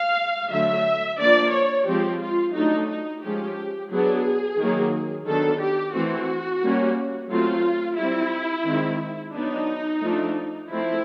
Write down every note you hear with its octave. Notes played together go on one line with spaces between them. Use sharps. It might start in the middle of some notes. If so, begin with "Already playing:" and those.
Already playing: F5
D3 F#3 A3 E5
F3 A#3 D4 D5
C#5
F3 G#3 C4 G4
F4
F#3 A3 D4 D#4
D#4
F3 G#3 C#4 G4
F#3 B3 D4 G#4
D#3 F#3 A#3
D#3 F#3 B3 D4 A4
G4
E3 A3 C4 F#4
G3 A#3 C#4
F#3 A3 C4 F4
G3 C4 E4
D#3 G#3 C4
F#3 B3 D4 D#4
F3 A3 D4
F3 A3 C4 E4